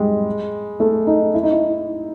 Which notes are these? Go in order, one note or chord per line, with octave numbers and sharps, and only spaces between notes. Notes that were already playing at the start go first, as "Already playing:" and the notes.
Already playing: G3 G#3
A3
D#4
E4
D#4
E4